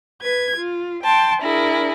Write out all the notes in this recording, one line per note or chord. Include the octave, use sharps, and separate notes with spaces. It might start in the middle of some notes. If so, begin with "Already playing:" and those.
B4 G#6
F4
G5 A5 C6
D4 E4 G#4 A#4